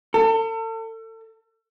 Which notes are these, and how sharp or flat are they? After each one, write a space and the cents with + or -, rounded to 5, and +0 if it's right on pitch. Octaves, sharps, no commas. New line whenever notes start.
A4 +35